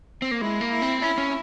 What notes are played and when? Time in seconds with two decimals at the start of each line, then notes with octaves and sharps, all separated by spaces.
0.22 C4
0.31 A#3
0.41 G#3 E4
0.61 A#3
0.71 E4
0.82 C4
1.02 C#4 E4
1.18 C#4